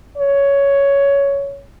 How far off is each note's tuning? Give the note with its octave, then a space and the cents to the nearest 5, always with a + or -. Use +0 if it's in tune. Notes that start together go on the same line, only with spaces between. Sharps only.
C#5 +10